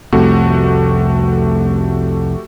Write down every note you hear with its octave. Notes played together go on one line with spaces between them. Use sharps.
C2 F2 C3 A3 F#4 G4